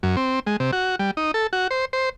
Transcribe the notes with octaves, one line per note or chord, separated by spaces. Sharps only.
F#2
C4
G#3
C3
F#4
G3
D#4
A4
F#4
C5
C5